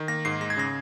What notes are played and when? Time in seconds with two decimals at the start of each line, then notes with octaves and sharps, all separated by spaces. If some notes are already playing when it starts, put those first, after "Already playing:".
Already playing: D#3
0.08 A#3 A#6
0.25 G#2 C7
0.41 G#3 A#6
0.50 G#6
0.57 C#3 A#6